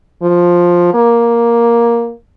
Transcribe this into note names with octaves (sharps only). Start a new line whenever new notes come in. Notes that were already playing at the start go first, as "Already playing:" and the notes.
F3
A#3